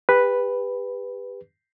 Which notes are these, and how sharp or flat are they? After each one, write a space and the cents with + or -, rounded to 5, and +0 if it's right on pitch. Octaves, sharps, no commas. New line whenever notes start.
G4 +30 B4 +0